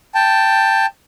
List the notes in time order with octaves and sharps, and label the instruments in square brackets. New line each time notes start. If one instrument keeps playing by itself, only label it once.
[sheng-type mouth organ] G5 A5